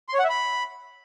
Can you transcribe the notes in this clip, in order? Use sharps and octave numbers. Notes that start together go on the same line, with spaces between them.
C6
C#5
F#5
E5
B5